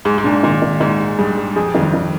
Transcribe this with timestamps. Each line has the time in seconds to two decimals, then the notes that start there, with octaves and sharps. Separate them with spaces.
0.05 G#2 G#4
0.18 G#2
0.24 A#2 D4
0.43 A#2 D#3
0.62 D#3
0.80 G#2 D#3
1.00 G#4
1.18 G2 G#4
1.37 G#4
1.56 F2 G#4
1.74 F2 D#3
1.81 G2
1.94 D#3